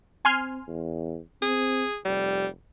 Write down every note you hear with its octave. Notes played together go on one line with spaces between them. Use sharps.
C4 G#5 C6 F6
E2
C4 G#4
F1 G3